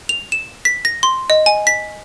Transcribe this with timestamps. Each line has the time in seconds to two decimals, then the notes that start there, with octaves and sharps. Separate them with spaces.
0.09 F7
0.32 E7
0.65 B6
0.85 A#6
1.03 C6
1.30 D#5
1.46 G#5
1.67 B6